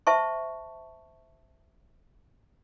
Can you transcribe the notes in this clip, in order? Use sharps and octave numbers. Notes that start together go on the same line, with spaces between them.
C5 E5 A5 C#6